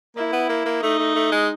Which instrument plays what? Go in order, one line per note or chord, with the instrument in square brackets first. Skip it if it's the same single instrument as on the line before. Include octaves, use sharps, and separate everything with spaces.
[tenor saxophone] A#3 [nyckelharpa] E4
[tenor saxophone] B3
A#3
A#3
[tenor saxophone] A3 [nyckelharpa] D#4
[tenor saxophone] A3
A3
G#3